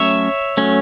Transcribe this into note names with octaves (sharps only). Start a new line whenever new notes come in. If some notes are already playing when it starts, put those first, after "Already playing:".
Already playing: F#3 A3 C#4 C#5 E5
F#3 A3 C#4